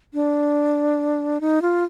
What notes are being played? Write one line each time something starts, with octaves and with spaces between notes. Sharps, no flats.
D4
D#4
F4